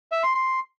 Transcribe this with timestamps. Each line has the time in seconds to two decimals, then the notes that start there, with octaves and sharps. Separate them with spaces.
0.12 E5
0.23 C6
0.35 C6